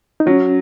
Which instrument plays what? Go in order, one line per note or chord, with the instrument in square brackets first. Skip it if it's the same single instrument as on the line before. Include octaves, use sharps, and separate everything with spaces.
[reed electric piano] D#4
[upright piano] F#3 [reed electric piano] C#4